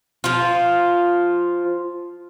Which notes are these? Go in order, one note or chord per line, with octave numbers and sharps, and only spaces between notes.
F3 F4